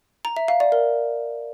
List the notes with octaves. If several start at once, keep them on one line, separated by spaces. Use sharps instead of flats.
A#5
E5
F5
D5
A#4